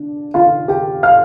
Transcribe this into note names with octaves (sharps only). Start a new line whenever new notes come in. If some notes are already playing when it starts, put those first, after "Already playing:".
Already playing: D4
F4 F5
G4 G5
F5 F6